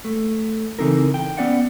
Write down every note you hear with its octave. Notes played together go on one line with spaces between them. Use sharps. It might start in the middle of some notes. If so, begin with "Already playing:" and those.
A3
C#3 E3 C4 D#4 A4 A#4
G5
B3 C#4 D5 E5 F#5